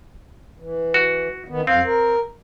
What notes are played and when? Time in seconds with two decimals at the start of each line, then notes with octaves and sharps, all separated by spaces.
0.60 E3
0.94 F#4
1.48 D#3 B3
1.67 F2 C4 F5
1.85 A#4